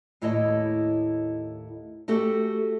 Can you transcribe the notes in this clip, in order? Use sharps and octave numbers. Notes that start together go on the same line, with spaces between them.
D#2 A2 E4 C#5 D#5 A5
A3 F#4 G4 A4